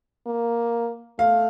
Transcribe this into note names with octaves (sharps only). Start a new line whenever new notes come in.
A#3
A3 F5